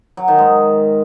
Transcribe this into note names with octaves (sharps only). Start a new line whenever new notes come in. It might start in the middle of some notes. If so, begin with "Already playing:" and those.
F#3
D#3
G#2